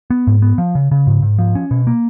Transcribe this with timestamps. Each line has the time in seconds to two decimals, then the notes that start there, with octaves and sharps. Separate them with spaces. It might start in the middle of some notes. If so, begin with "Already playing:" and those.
0.10 B3
0.27 G#2
0.42 B3
0.58 F3
0.75 C#3
0.91 C#3
1.07 G#2
1.22 G#2
1.38 F3
1.55 C#4
1.71 B2
1.87 A#3